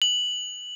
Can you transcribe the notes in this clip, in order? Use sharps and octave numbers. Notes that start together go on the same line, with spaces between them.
F#7